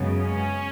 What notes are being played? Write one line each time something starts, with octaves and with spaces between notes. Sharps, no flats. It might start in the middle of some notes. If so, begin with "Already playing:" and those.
Already playing: F#2 C#3 G#3 B3
C#4